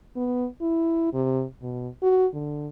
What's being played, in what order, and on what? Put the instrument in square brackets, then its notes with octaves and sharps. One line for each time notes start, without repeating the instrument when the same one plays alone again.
[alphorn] B3
E4
C3
B2
F#4
D3